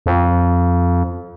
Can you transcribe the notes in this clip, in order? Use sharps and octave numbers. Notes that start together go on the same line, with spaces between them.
F2